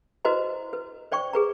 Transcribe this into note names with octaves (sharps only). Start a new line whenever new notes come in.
E4 F#4 B4 C5 D#5 A#5
B4
C5 D5 G5 C#6
G#4 B4 A#5